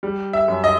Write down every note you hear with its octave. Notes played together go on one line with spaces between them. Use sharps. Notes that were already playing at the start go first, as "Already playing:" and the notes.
G3
E5
F#2
D#5